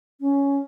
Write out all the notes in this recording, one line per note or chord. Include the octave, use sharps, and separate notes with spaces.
C#4